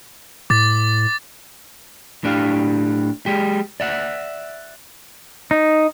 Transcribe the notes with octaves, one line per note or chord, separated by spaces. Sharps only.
A2 D6 A6
A2 D4 G4 F5
G#3 G4
D5 E5 F#5
D#4